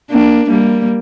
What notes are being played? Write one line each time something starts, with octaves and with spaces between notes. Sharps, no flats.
A#3 D4
G3 A#3